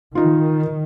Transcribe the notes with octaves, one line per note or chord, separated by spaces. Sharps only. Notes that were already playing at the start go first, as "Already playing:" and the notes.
D#3 D#4 F4